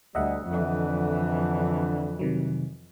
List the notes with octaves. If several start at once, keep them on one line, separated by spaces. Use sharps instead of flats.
D2 G3 D#5 E5 F#5
F2 D3 E3
C3 D#3 F#3